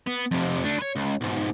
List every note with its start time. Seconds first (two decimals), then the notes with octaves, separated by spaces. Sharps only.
0.07 B3
0.31 F2 C3
0.64 A3 D4
0.79 B4 C#5
0.96 C#2
1.21 B1 G#2